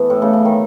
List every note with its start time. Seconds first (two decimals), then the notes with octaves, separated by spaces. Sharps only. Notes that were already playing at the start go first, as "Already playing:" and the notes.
Already playing: E3 A3 B3
0.10 A2
0.22 C#3
0.33 C#3
0.45 D#3